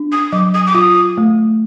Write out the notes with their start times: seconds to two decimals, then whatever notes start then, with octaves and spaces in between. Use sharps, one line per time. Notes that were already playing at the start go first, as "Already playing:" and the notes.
Already playing: D4
0.12 D#6
0.32 F#3 D6
0.54 D#6
0.67 D6
0.75 F4 D#6
1.18 A3